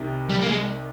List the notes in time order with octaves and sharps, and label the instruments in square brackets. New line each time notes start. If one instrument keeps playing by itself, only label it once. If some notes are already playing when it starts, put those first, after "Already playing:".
Already playing: [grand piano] C2 C3 D#3
[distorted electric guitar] G3
A#3
G#3